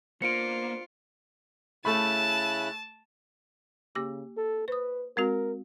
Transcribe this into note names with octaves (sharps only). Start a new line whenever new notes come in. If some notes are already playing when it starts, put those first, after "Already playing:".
A#3 B3 D4 F4 C5 C#7 D7
C#3 A3 E4 A5 B5 F#6
C#3 A#3 G4 D6
A4
B4 C5 D#6
G#3 C4 F#4 A#4